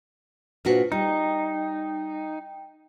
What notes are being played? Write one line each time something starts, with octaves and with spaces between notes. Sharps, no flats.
A#2 D4 F4 F#4 B4 C5
G3 D#4 G5